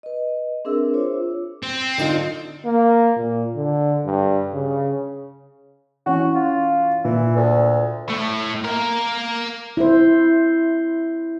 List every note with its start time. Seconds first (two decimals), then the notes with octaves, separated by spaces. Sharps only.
0.03 B4 D#5
0.65 C4 D4 G#4 A#4 E5 E6
0.94 F4 C5 C#5 E5 D6
1.63 C4
1.98 D3 D#4 F4
2.64 A#3
3.16 A#2
3.56 D3
4.05 G2
4.53 C#3
6.06 E3 C#4 F#4
6.35 F4
7.05 A#2 E3
7.36 D2
8.10 A2 A3
8.65 A#3 A#4
9.77 E4 C5